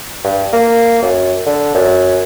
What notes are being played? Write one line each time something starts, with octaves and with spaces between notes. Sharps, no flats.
G2
A#3
F#2
D3
F#2